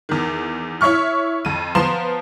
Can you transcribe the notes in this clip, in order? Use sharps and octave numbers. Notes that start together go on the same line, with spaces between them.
E2 D#3
E4 C#5 E5 C#6 F6
F2 D#7
F3 B3 A#5 C6 E7